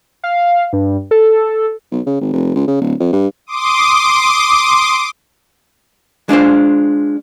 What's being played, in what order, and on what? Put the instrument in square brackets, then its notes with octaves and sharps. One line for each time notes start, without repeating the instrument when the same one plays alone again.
[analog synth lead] F5
G2
A4
[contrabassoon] B1
C#3
G#1
F1
C#2
C#3
D1
F2
G2
[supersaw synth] C6 D6 D#6
[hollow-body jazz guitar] G#3 D4 F4 C5